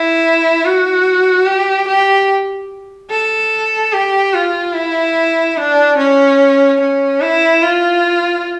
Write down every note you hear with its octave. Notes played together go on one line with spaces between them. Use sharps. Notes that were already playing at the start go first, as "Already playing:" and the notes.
Already playing: E4
F#4
G4
G4
A4
G4
F4
E4
D4
C#4
C#4
E4
F4